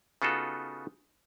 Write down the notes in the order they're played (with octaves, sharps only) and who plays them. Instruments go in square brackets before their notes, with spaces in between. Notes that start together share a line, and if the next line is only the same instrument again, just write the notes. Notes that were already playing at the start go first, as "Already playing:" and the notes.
[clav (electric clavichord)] C#3 B3 D#4 F4 F#4 A4